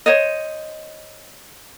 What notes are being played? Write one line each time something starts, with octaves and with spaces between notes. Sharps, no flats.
C5 C#5 D#5